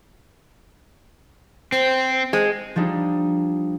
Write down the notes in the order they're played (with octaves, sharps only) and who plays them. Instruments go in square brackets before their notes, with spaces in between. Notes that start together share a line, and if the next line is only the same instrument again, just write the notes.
[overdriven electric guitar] C4 [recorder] C5
[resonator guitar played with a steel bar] G#3 [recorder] C5
[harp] F3 G3 D4 D#4